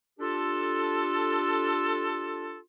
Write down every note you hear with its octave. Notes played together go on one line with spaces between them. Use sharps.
D4 F4 G4 A4